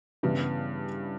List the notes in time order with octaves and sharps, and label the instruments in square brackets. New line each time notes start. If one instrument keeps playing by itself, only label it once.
[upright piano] G2 [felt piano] C#3 E3 G3 B3 E4